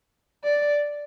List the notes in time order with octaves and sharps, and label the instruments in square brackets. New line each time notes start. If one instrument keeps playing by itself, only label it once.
[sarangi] D5